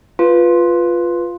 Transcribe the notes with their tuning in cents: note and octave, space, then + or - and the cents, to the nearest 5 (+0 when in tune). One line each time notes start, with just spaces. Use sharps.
F4 +0 B4 +0